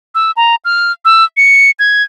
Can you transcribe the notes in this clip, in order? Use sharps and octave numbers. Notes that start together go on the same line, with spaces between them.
E6
A#5
F6
E6
C#7
G#6